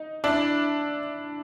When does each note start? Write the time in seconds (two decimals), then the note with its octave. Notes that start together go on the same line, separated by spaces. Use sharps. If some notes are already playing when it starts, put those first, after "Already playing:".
Already playing: D#4
0.24 D4 E4